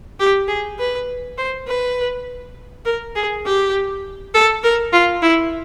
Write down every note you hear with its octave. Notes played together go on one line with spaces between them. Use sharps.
G4
G#4
B4
C5
B4
A#4
G#4
G4
A4
A#4
F4
E4